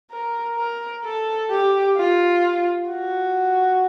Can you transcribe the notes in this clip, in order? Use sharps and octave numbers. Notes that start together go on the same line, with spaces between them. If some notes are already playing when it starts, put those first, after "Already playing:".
A#4
A#4
A4
G4
F4
F#4